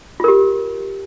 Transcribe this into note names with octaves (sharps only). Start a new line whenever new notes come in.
F4 G4 A#4